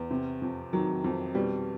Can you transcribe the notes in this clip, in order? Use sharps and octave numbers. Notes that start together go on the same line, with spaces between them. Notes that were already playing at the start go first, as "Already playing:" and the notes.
Already playing: E2
C3
F2
D#3 F#3
F2
B2 G3